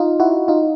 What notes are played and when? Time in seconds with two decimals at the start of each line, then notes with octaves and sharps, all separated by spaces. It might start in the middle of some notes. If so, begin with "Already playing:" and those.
Already playing: D#4 F4
0.20 E4 F#4
0.48 D#4 F4